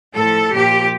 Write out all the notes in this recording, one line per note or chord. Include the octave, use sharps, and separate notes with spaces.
A2 F3 A4
A#2 F3 G4